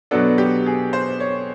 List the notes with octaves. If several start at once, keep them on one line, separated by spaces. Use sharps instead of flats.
B2 F#3 B3 D4 A4
G4
G#4
C5
C#5